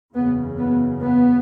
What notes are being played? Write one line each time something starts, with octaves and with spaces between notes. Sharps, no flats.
F#1 E2 C#3 B3
B3
B3